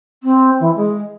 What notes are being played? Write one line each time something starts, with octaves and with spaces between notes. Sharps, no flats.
C4
E3
G#3